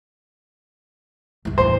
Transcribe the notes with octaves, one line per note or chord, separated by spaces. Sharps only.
G1 C#2
E2 A2 C5